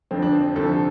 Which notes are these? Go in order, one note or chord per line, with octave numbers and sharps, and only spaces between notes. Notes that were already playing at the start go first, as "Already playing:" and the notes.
F2 D3 F3 C4
D4
C4
D2 C3 F3 A4